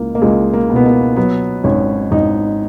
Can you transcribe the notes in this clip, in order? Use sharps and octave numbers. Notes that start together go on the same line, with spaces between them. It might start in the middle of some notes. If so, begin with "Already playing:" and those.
Already playing: C#2 A#3
A#3
C#2 G#3
A#3
B2
B3
A#3
F#3 B3
G#1 C#4
G#1 D#4